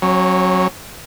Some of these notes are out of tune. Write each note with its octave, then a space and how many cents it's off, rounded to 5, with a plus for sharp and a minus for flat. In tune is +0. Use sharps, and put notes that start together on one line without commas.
F#3 +0 C#4 -35